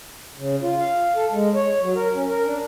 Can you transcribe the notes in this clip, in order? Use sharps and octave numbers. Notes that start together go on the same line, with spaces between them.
C#3
F4
F5
A4
G#3
C#5
F#3
A#4
C#4
A#4
D4